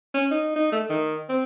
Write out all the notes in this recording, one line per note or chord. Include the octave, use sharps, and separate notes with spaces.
C#4
D#4
D#4
A3
D#3
C4